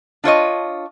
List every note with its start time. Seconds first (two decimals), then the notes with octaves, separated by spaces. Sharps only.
0.24 D4 F4 C#5 D#5